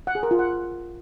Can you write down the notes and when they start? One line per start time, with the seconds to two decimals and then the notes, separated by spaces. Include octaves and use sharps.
0.07 F#5
0.15 G#4
0.23 A#4
0.31 F4
0.39 F#5